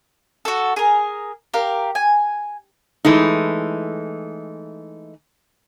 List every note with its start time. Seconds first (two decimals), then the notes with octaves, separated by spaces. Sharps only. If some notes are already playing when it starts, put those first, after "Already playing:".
0.45 F#4 A4
0.76 G#4 A#4
1.54 G4 A#4 F5
1.95 G#5
3.05 E3 G#3 A3 D#4